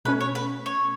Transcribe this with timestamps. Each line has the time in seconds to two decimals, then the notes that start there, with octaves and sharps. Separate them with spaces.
0.05 B2 A3 C#4 B4
0.20 C#5
0.35 B4
0.66 C#5